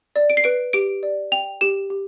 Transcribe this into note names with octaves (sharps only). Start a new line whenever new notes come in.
D5
D7
C7
B4 D7
G4 D7
D5
G5 F7
G4 E7
G4